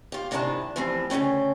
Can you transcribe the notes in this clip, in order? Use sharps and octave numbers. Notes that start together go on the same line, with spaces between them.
F4 G4
G#2 C3 D#3 D4 E4 A5
A2 E3 F3 G3 C4
D2 C#3 E3 C#4 G5